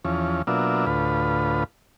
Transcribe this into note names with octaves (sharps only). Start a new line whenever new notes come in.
E2 F3 C#4
B2 F#3 A#3 D4 F4 E5
D2 A2 F4 B4